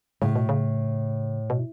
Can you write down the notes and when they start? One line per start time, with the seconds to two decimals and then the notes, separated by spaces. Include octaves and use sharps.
0.22 A2 C#3
0.36 B2
0.49 C#3
1.50 B2